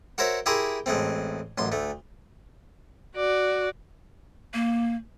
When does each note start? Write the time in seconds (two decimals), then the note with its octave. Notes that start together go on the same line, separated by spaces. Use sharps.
0.18 F#4 A#4 C5 C#5 E5
0.46 E4 G4 G#4 A#4 E5 C6
0.86 A1 G#3 A3 C4
1.58 A1 F#2 C6
1.72 D2 A3
3.16 F#4 D5
4.54 A#3